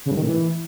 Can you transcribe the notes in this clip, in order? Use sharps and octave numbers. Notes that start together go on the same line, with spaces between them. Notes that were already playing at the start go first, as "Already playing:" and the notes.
C#3
G2
D#3
A2
E3